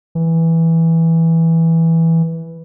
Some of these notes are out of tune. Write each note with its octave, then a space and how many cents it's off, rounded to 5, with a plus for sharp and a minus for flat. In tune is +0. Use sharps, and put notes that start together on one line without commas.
E3 -5